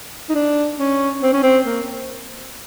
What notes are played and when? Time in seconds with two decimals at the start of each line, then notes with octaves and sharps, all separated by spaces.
0.29 D#4
0.35 D4
0.80 C#4
1.23 C4
1.33 C#4
1.43 C4
1.66 A#3